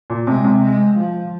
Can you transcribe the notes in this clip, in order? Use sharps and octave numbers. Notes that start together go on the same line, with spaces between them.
A#2
C3 G#3
C3
G#3
F3